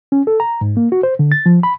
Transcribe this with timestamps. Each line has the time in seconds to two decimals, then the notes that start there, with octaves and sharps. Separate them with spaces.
0.12 C#4
0.27 A4
0.40 A#5
0.61 G#2
0.77 A#3
0.92 F#4
1.03 C5
1.19 D3
1.32 A6
1.46 F3
1.63 B5